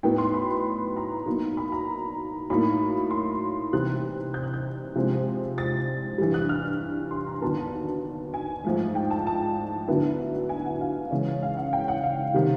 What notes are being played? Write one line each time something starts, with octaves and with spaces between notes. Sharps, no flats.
A2 F#3 B3 D#4 G5
C6
B5
A#5
B2 F#3 A#3 D#4
B5
A#5
A2 F#3 A#3 D#4 B5
C6
C3 E3 G3 C4 F#6
G6
F#6
G6
C3 F3 G#3 C4
A6
G2 E3 G3
F#6
F6
C6
A#5
D#2 D3 F#3 B3 A5
G#5
G#2 F3 A3
G5
A5
A5
D2 D3 F#3 B3 E4
G#5
F#5
F5
C#3 E3 G#3 C#4
F5
F#5
G5
F#5
F5
C3 D#3 G3